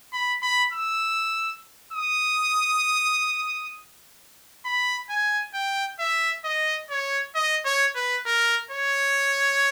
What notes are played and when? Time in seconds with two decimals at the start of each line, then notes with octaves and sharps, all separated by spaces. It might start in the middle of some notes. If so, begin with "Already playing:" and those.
0.13 B5
0.43 B5
0.73 E6
1.93 D#6
4.65 B5
5.10 G#5
5.54 G5
5.99 E5
6.44 D#5
6.90 C#5
7.35 D#5
7.65 C#5
7.96 B4
8.26 A#4
8.71 C#5